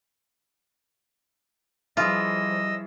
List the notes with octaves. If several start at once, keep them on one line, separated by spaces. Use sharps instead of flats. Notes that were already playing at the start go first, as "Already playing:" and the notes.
E3 F3 G3 F4 G#4 D#5 E6